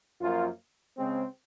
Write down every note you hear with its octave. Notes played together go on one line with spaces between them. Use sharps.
F#2 F3 A#3 F4
C#3 G#3 C4